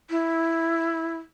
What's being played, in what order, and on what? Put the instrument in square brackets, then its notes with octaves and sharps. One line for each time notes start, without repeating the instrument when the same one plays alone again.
[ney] E4